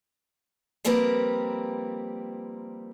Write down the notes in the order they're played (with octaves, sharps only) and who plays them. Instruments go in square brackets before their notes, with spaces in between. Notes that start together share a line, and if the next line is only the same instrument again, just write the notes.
[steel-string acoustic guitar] F3 G3 A#3 C4 A#4 B4